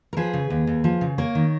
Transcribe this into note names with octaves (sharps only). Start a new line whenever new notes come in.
A#4
F3 G#4 B4
C#3
D#2
D#2
F3
C#3
A#3 A#4 C#5
D#3